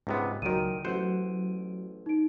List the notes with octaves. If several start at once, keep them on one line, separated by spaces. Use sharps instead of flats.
C#2 G#2 C3 B3
C#2 A#2 D#3 F#3 D7 D#7
A1 F#3 C5 F#5
D#4 D7